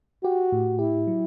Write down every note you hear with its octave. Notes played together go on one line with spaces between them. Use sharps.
F#4 G4
A2
E4 G4
F#3